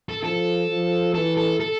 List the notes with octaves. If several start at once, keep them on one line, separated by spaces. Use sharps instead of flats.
A4
F3 A4
F3
E3 A4
A4
A4